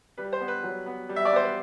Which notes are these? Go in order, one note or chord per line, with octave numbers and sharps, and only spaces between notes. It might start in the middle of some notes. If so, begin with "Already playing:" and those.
G3 B4
C5
B3
B4
F#3
B3
G3
E5
D5
B3 C5
B4